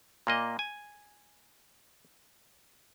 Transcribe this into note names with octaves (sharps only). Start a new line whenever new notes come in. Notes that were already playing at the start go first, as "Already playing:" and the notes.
A#2 A#3 D#5
G#5